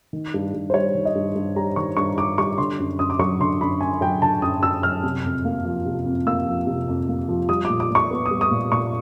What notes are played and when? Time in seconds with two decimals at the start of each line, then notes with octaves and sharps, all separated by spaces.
0.13 D#3
0.34 G2
0.54 G2
0.70 C5
0.74 G3 C#5
0.95 D#3
1.05 D#5
1.15 G2
1.36 G2
1.56 G3 A#5
1.76 D#3 C#6
1.97 G2 C#6
2.18 G2 D6
2.38 G3 C#6
2.58 D3 C6
2.79 F#2
2.99 F#2 D#6
3.10 D6
3.19 F#3 C#6
3.40 D3 C6
3.61 F#2 B5
3.81 F#2 G#5
4.01 F#3 G5
4.22 D3 A5
4.42 F#2 D#6
4.63 F#2 E6
4.83 F#3 F6
5.03 C3
5.24 F2
5.45 A#3
5.65 F3
5.86 C3
6.06 F2
6.27 A#3 E6
6.47 F3
6.67 C3
6.88 F2
7.08 A#3
7.29 F3
7.49 G3 D#6
7.65 A#2 D6
7.80 D6
7.91 A#2 C#6
8.11 B3
8.26 D#6
8.31 G3
8.41 D#6
8.51 A#2
8.72 A#2 C#6